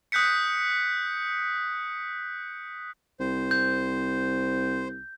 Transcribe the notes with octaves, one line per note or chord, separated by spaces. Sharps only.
D#6 F#6 G6 B6 C#7
C2 C5
G6